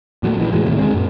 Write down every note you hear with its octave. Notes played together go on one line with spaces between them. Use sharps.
A#2 F#3 G#3 A3
A#1 E3
A2 E3 F#3 G#3
D#2 A2 C3
D2 G#3 C4
F#2 A#2